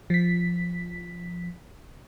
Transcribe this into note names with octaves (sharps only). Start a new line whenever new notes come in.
F3 B6